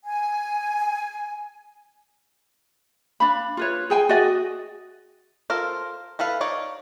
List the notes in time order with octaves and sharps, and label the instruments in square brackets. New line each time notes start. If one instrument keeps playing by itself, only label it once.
[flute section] G#5
[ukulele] D4 F5 B5
F4 B4 C#5
G#4 G5 G#5
F#4 G#4 D5 D#5
[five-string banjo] F4 A4 A#4 C5
E4 A4 B4 F5
D#4 C#5 D5